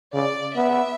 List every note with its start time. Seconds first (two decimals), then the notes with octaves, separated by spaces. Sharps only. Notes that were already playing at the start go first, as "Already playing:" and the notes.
0.13 C#3 D5
0.55 B3 E5